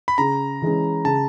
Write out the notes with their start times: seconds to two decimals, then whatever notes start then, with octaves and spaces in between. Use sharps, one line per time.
0.08 B5
0.18 C#3 A#5
0.62 E3 G#3 C#4
1.05 C#3 A5